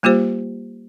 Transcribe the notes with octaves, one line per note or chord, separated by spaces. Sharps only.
G3 A#3 F4 G4 C5